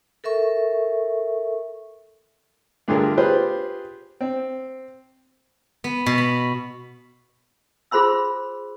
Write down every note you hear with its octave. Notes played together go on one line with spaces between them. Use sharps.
A4 A#4 E5 C#6
D2 G2 D3 F4 G#4 A#4
F4 G4 G#4 B4 C5
C4
B3
B2
B5
F4 G#4 C5 B5 C6 E6